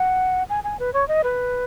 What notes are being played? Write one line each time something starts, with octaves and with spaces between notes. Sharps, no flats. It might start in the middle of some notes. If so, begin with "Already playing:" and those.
Already playing: F#5
G#5
G#5
B4
C#5
D#5
B4